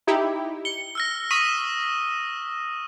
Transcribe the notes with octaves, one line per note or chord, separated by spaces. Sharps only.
D#4 E4 G4
C#7 G7
E6 F6 A#6
C#6 D#6 B6 D#7